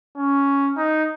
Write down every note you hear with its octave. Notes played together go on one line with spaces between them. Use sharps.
C#4
D#4